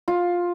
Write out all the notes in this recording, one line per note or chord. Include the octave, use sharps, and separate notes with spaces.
F4